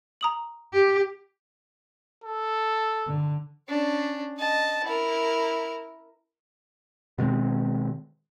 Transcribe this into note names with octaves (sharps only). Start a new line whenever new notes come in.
A#5 D#6 F#7
G4
A4
D3
C#4 D4
D#5 A5
E4 A#4
B2 D#3 G#3 C4